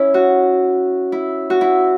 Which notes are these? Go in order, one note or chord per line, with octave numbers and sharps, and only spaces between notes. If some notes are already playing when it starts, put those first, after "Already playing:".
Already playing: C#4 E4
F#4
E4
F#4
E4